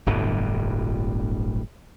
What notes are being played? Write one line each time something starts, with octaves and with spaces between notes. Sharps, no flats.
D1 G1 G2 B2